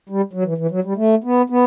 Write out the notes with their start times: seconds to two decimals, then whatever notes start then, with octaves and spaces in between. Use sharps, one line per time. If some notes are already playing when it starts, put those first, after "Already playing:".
0.09 G3
0.33 F#3
0.44 E3
0.58 E3
0.71 F#3
0.84 G3
0.96 A3
1.24 B3
1.50 B3